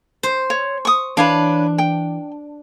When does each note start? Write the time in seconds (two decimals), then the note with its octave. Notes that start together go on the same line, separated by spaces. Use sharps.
0.23 C5
0.50 C#5
0.85 C#6 D#6
1.17 E3 D4 B4 C#5 F5
1.78 G5